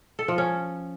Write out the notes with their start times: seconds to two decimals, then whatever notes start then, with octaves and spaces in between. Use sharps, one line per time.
0.19 A4
0.28 F3
0.38 C#4